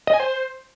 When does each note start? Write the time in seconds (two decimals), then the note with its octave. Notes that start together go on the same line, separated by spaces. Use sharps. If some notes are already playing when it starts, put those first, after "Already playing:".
0.07 D#5
0.14 G#5
0.20 C5